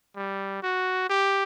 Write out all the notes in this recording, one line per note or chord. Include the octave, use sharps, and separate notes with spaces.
G3
F#4
G4